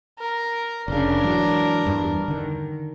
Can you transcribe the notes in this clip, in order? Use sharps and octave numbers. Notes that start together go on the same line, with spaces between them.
A#4
F1 C#3 D4 A#4
G#2 E3 F#3
E2 G2
D3 D#3